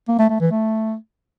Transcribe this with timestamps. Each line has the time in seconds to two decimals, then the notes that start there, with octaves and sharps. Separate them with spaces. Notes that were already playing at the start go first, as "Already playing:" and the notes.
0.08 A#3
0.19 A3
0.30 A3
0.40 E3
0.51 A3